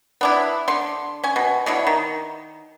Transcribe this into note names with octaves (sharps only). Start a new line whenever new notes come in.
B3 D4 E4
D3 C6
C#4 G#5
B2
B2 D3 E4 C#5
D#3